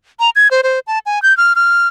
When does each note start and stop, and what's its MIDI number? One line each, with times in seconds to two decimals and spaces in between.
0.20 0.30 82
0.36 0.50 92
0.51 0.61 72
0.63 0.79 72
0.87 0.99 81
1.06 1.22 80
1.22 1.36 91
1.37 1.53 89
1.56 1.88 89